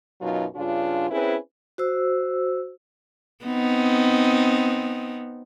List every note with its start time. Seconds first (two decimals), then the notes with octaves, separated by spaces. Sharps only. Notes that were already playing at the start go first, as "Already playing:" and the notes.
0.21 F#2 B2 F#3 D#4 F4
0.55 G2 C#3 D4 F4
1.10 C4 C#4 E4 G#4 B4
1.78 F#4 C5 E6
3.45 B3 C4 D#4